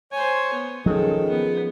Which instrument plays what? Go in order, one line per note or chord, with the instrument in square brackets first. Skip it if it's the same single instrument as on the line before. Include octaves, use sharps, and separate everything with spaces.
[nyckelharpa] C5 G#5 [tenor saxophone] C#5
[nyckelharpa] B3
[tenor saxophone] D#3 [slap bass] F3 C#4 [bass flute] G#4 [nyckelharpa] A4
[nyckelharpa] B3